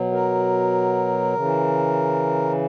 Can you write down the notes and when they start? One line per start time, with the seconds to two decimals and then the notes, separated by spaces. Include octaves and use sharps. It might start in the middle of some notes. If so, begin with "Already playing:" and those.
Already playing: B2 F#3
0.12 A#4
1.34 C#3 E3